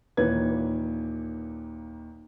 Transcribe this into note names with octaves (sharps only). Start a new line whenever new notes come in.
D#2 A#2 E3 B4 G#6